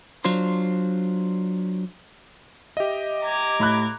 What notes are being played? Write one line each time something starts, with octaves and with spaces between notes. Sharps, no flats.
F#3 D4 F4 C5
G4 D#5 E5
A#5 D6 G#6
A2 B5 F#6